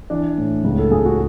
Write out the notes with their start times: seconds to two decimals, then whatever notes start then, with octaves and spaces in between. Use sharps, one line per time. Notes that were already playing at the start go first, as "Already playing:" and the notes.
0.10 E3 D4
0.38 A2
0.64 C#2
0.78 A4
0.91 C#2 G#4
1.05 F#4